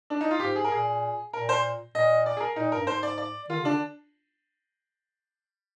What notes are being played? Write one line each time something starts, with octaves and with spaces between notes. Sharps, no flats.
D4
D#4
F4
G#2 G4
G#4
A#4
A#2 G#4
A#2 A#4
C5
A#2 D#5
D5
G#4
A#4
A#2 D#4
G2 A#4
G#2 C5
D5
D5
D#3 F4
D3
C3 D4
D3